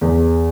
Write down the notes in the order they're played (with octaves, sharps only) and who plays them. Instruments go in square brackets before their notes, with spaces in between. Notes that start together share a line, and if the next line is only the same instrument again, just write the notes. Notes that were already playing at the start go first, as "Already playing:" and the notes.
[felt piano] E2